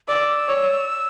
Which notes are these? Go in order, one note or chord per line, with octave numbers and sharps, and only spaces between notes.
D5 E6
C#5